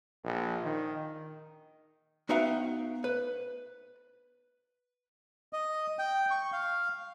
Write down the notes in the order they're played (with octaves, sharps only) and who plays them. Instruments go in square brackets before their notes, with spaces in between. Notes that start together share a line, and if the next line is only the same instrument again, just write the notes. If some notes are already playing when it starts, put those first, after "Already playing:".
[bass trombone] A#1
D#3
[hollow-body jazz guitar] B3 D#4 F#4 E5 F5 G5
B4
[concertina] D#5
G5
C#6
F5